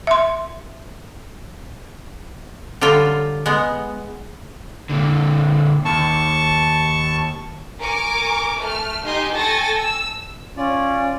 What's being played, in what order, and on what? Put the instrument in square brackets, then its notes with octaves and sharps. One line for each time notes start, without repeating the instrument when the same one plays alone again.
[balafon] E5 C6
[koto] D3 F#3 G3 F4
G#3 B3
[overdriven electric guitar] A#2 D3
[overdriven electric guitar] D#2 [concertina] A5 C#6
[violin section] A#4 G#5 C#6 D6
A3 F6
D#4 G4 D#5 G#5 C6
A4 G5 G#5 C#6 A6 A#6
E6
[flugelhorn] C#4 [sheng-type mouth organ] F4 D5